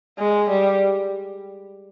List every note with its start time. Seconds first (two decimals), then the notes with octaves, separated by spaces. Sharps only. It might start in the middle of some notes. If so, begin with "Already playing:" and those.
0.19 G#3
0.50 G3